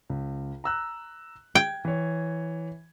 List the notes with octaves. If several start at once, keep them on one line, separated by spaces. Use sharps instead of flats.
C#2
A#5 E6 F#6
G5 G#6
E3 C#5